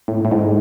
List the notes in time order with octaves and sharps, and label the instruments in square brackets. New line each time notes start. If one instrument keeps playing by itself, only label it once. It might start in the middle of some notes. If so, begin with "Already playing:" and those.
[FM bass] A2
A2
G#2